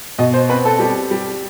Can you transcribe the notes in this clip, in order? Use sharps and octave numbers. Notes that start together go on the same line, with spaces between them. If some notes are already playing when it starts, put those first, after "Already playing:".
B2 D#5
C5
C4 B4
A4
G3
G3